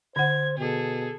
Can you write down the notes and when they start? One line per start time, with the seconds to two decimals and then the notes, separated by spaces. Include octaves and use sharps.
0.16 D3 C5 F#5 G#6
0.58 B2 G#4 A4